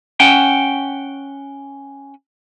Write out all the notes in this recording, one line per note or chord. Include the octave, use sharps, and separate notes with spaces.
C#4 F#5 G5